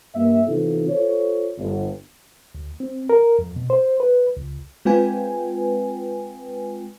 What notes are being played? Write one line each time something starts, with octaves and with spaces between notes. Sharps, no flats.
G2 A#3 E5
C3 E3 B3 D#4 F4 A4
F4 A4 C5 C#5
G1
D2
C4
A#4
F2
B2
C5
B4
C#2
G#3 C4 F4 B4 G5 G#5